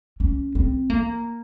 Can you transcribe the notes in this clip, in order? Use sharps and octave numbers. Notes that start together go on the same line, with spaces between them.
C#4
C4
A#3